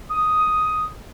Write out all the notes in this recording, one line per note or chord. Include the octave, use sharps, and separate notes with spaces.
D#6